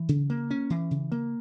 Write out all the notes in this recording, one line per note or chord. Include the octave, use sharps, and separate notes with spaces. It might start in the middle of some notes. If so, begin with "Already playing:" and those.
Already playing: E3
C#3
A#3
C#4
E3
C#3
A#3